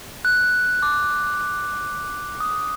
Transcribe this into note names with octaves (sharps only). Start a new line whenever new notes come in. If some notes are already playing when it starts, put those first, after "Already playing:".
F#6
D6
D#6